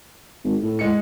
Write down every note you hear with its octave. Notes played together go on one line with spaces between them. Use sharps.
G#1
A2
G#3 C#7